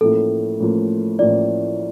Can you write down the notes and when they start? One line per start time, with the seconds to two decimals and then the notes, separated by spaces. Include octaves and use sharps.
0.01 A1 A2 F3 A#3 A4
0.60 A1 A2 F3 A#3
1.19 A1 A2 F3 A#3 D5